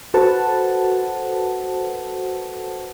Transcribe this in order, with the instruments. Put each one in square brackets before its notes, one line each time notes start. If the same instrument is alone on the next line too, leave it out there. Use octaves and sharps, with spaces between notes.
[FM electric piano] F#4 A4 B4 C5 F#5 A5